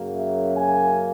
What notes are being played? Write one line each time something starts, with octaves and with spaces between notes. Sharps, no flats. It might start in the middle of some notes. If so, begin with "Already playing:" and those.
Already playing: F#2 C#3 F#3 A#3
E5
G#5